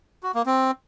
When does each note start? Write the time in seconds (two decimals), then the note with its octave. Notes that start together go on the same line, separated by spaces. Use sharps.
0.23 F#4
0.35 A#3
0.46 C4